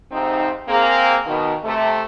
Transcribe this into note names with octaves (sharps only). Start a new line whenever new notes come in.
F2 G#2 C3 C4 D#4
A#3 C4 G#4
B2 D#3
C3 A3